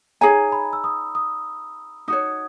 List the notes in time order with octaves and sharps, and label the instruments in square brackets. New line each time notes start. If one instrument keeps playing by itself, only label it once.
[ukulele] D#4 G#4 C#5 G#5 [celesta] A#5
[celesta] B5
E6
D#6
D#6
[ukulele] D#4 F#4 C#5 [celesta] D#6